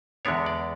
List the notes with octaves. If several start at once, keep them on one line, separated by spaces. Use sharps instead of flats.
E2 D3 G#3 B3 D4 C#5
D5